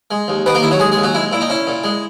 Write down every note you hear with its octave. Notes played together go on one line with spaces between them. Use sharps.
G#3
D#2
D#3 B3 B4
A#3 A#4
D#2 E4
F#3 F#4
G#3 G#4
G#3 G#4
D#2
F#3 F#4
G#3 E4
A#2 E4
D#4
C#4 E4
A#2
G#3